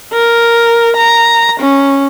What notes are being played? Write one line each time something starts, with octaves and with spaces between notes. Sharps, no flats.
A#4
A#5
C#4